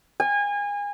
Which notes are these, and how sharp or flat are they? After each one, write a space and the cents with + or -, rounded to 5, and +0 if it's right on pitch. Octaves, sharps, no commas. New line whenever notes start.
G#5 -30